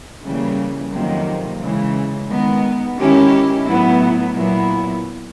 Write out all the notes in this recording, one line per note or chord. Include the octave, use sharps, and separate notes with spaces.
C#3 E3 G3 A#3
F2 C3 D#3 F#3 A#3
C#3 E3 G#3
D#3 G#3 B3
D#3 G#3 C#4 E4 G4
A2 F#3 B3 E4
A#2 F#3 B3 E4